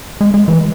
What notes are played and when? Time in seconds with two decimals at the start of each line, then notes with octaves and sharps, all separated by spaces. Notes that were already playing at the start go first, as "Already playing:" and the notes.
0.21 G#3
0.34 G#3
0.48 E3